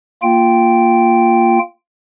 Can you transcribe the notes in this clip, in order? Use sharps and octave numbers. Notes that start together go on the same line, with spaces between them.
A#3 F4 G5